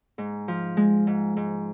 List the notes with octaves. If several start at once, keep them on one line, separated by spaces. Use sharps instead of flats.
G#2
F3
G#3
G#2
G#2